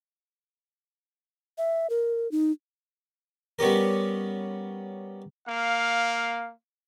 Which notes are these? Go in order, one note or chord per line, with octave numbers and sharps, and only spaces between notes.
E5
A#4
D#4
G3 B3 C#4 G4 A#4
A#3 F5